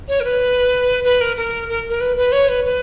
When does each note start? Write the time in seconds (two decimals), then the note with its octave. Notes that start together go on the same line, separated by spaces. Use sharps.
0.08 C#5
0.20 A#4
0.24 B4
1.04 B4
1.21 A#4
1.37 A#4
1.69 A#4
1.90 A#4
2.01 B4
2.17 B4
2.32 C#5
2.49 B4
2.65 B4